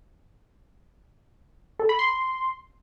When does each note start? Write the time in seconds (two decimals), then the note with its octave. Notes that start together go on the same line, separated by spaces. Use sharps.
1.79 A4
1.89 B5
1.99 C6